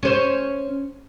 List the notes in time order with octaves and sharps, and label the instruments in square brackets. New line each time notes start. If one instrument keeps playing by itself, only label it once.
[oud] C#4 C5